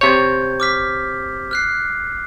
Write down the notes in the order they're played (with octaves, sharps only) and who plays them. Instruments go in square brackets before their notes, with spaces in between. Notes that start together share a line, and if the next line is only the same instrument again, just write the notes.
[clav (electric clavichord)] C3 C#5 [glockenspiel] G6 G#6
[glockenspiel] D6 F6 B6
F6 F#6 C7